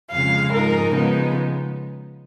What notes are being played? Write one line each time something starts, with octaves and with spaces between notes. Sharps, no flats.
F2 C#3 G#3 F5
G#2 F3 G#3 D#4 A#4
C#3 F3 G#3 B3 D#4